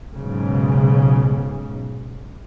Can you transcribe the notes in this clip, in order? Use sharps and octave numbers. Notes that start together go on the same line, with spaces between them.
B1 G#2 C#3